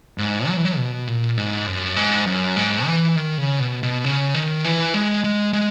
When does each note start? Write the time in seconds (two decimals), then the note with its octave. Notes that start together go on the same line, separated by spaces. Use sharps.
0.18 G#2
0.48 F#3
0.57 E3
0.65 F#3
0.77 B2
1.07 A#2
1.37 G#2
1.67 F#2
1.96 G#2
2.27 F#2
2.56 G#2
2.86 E3
3.16 D#3
3.38 C#3
3.60 B2
3.83 B2
4.04 C#3
4.34 D#3
4.64 E3
4.94 G#3
5.24 G#3
5.53 G#3